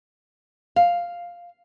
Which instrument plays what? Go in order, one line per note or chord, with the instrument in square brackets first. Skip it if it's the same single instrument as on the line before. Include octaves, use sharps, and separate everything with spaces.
[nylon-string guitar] F5